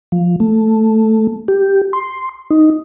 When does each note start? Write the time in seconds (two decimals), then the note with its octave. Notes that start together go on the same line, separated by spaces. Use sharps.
0.12 F3
0.40 A3
1.48 G4
1.93 C6
2.50 D#4